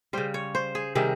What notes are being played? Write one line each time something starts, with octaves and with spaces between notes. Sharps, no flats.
C#3 G3 C5
C#5
C5
G#4
C3 D#3 G3 G#4